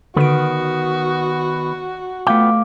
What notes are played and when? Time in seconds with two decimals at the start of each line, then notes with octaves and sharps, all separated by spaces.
0.16 D3 D#3 B3 F#4 B4 D7
2.27 A3 B3 F4 F5 G5 D6